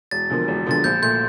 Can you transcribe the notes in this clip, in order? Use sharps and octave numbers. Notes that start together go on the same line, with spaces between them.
E1 A6
E2 D3 F3 A#3
E1
E2 D3 F3 A#3 A6
A#1 G6
A#2 A3 G6